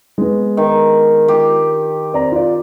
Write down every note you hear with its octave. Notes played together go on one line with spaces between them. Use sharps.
G#3 B3
D#3
G4
C4 D5 A#5
F4 D5